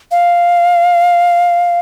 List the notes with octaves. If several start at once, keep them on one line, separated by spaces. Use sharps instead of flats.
F5